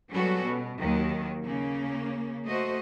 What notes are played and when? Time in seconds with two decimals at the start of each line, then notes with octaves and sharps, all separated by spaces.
0.12 F#3 G3 B3 C#4 F#4 A4
0.43 B2
0.79 D#2 D#3 F#3
1.44 C#3 A#3 C#4
2.48 A3 F#4 C5 D#5